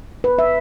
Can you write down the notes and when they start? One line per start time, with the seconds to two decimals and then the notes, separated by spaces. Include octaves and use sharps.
0.24 B4
0.39 E5